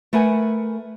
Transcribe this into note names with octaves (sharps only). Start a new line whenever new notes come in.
A3 A#4 B4 F#5 G#5